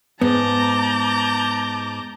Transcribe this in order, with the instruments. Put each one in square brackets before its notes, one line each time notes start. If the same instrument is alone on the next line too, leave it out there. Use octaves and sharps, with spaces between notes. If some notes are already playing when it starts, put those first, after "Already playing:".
[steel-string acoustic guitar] G#2 [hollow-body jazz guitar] B3 [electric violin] A5 D6 [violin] A#5 G6